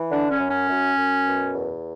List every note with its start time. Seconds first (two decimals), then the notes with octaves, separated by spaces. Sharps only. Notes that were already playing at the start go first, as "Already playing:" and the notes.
Already playing: E3
0.10 D3 D4
0.31 C#4
0.39 F#2
0.49 C#4
0.69 F#2
0.97 F#2
1.26 B2
1.54 E2